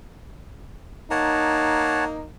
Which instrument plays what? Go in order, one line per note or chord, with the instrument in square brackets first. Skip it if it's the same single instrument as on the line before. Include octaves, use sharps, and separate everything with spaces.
[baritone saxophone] A#3 [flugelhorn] D#4 [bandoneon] C#5 F#5 A5